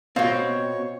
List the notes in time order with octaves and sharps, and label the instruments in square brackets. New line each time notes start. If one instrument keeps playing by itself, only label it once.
[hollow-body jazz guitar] B2 C4 [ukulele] F4 D#5 F5 [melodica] C#5